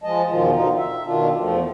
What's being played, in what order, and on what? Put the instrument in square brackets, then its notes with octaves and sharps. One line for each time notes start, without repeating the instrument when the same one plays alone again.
[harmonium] F3 G#3 D#5 A5
E2 B2 D#3 F3 F4
B2 D3 D#4 F4
E5
B2 D#3 D4 F4
E2 F3 A3